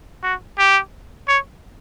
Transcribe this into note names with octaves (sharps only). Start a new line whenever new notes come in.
F#4
G4
C#5